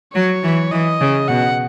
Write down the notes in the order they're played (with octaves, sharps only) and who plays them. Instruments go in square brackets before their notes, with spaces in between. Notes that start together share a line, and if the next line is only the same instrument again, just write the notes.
[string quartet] F#3 [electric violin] C#5
[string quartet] E3
[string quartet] E3 [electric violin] D#5
[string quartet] C#3
[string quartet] B2 [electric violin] F#5